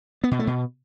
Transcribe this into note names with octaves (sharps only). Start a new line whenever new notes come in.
B3
B2
A3
B2